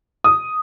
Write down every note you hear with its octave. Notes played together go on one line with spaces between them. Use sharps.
D#6